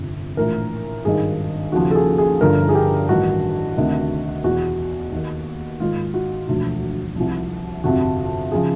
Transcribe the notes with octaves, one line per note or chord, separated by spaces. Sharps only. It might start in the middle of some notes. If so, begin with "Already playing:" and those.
Already playing: G1 F2 C3
A#1 A2 E3 A#4
G#1 G2 D#3 G#4
D#2 C#3 F3 F#4
A4
G#4
G#4
G1 G2 D3 F3 A#4
G#4
G4
A1 G2 D#3 F#4
D2 C3 D#3
E2 B2 F#4
D#2 D#3
G#1 G#2 D#3 F4
F#4
E1 D2 D3 F3
C2 C3 F3
G1 F2 C3 F#4
C#3 F3 G#4